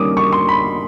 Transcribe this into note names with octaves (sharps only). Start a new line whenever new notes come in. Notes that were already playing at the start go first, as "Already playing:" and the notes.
Already playing: D#3 G3 A#3 C#4 D6 D#6
C#6
C6
B5